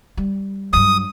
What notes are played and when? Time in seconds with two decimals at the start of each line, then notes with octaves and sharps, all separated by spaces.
0.17 G3
0.73 G2 F#3 D#6